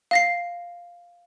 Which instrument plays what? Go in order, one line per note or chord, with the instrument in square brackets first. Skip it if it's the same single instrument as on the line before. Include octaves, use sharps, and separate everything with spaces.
[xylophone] F5 A#6 C7